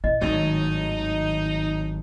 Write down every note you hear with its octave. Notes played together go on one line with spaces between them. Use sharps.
A#1 E4 D#5
G#1 A2 D#3 F#3 D#4